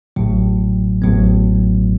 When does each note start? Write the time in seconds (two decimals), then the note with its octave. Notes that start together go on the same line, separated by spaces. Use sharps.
0.16 A1 A2 F#3
1.02 A1 A2 F#3 B3